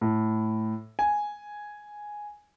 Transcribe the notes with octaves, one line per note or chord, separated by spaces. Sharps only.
A2
G#5